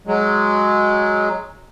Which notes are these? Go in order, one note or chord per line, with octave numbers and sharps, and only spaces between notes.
F#3 G#3